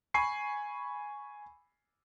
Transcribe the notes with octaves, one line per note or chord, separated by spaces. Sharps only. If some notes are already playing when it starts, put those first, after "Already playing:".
G#5 B5 C#6 C7